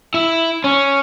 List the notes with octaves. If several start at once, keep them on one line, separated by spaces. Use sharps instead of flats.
E4
C#4